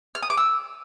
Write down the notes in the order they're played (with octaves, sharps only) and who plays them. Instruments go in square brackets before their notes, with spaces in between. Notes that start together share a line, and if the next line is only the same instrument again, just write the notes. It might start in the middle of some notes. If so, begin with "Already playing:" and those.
[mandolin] F6
D#6
D6
E6